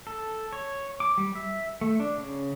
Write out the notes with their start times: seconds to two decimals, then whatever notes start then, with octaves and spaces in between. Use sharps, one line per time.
0.07 A4
0.53 C#5
1.00 D6
1.18 G3
1.35 E5
1.81 A3
2.00 D4
2.18 C#3